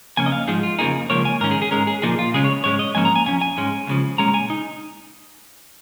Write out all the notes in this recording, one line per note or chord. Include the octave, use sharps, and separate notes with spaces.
F2 C#3 A#3 C#4 G#5
D#5
F5
G#2 F3 G#3 D#4 G#4
F4
F2 C#3 F3 A#3 D#4 G#4
C#2 C#3 F3 A#3 C#5
G#5
G#2 D#3 C#4 A#4
G#4
G#4
G#2 G#3 C#4 A#4
G#4
A#2 F3 A#3 D#4 G#4
F4
C#2 C#3 G#3 C#4 G#4
C#5
G#2 G#3 C#4 C#5
D#5
G#2 F3 A#3 C#4 G#5
A#5
G#5
F2 F3 C#4 G#5
G#5
G#2 G#3 C#4
C#2 C#3 F3
A#2 G#3 C#4 A#5
G#5
D#4